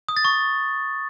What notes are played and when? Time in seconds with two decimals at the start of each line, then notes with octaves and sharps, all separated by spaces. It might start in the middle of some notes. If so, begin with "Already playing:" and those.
0.09 D#6
0.17 A6
0.25 C#6